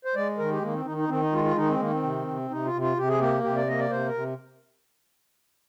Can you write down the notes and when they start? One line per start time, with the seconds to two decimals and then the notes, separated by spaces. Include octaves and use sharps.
0.05 C5
0.15 G#3 D5
0.38 D#3 A#4
0.51 G4
0.62 D#3 A#3
0.74 C4
0.85 D#3 D#4
0.97 D#4
1.08 D#3 C4
1.21 D#4
1.32 G#3 F4
1.44 F4
1.56 D#3 D#4
1.68 C4
1.79 D#3 A#3
1.91 C4
2.03 C3
2.27 C3
2.50 C3 D#4
2.65 F4
2.73 C3
2.81 F4
2.97 C3 G4
3.08 G#4
3.20 A#3 G4
3.43 C3 G4
3.56 D5
3.68 A#3 D#5
3.79 D5
3.90 C3 C5
4.07 A#4
4.14 C3